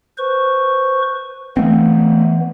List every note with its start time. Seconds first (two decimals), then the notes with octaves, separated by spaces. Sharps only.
0.18 B4 C5 C#6
1.57 E3 A3 B3 C4